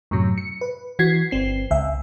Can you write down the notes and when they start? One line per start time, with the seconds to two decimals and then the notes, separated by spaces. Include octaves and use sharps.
0.11 F#2 A2 C3 F#3
0.38 C#7
0.61 B4
0.99 E3 F#4 G#6 C7
1.31 G1 C4 C7
1.71 C#2 E5